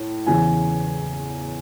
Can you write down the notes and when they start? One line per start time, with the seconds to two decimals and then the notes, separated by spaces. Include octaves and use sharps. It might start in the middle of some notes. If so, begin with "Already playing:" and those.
Already playing: A2
0.26 E2 C#3 E3 G#5